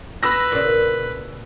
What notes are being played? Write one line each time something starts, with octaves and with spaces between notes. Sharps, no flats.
B4 B5 E6 A#6
A#2 C#3